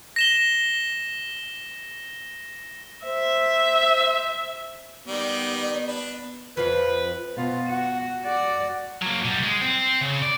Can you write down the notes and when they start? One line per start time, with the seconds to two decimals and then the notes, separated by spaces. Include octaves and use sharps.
0.16 A#6 E7 G7
3.06 C5 E5
5.08 D#3 G3 B3 D5
5.88 D4 B4
6.57 F2 F3 B4
7.37 B2 F4
7.68 F#4
8.24 F#4 D5
9.02 F#3 A#3
9.24 B2 G3
9.43 G#3
9.62 C4
10.01 C#3
10.22 D5